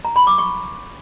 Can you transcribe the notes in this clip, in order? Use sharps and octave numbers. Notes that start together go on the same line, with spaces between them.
A#5
B5
D6
C#6